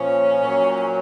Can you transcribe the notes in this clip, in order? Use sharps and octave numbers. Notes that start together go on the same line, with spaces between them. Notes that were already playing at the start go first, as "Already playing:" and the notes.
Already playing: A#2 F3 C#4
A#2 F#3